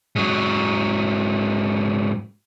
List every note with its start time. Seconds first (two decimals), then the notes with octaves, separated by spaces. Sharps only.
0.16 G#2 F#3